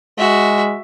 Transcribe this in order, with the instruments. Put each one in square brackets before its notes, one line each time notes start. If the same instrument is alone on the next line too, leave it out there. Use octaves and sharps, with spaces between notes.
[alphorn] G#3 [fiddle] F#4 E5